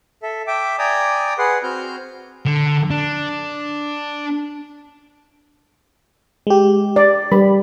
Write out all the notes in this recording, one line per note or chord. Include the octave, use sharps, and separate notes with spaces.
A4 E5
E5 G5 D6
D5 G5 G#5 A#5 D#6
G#4 B4 F#5 C6
C4 F#4 F6 G6
D3
D4
G#3 G4
D5
G3 B5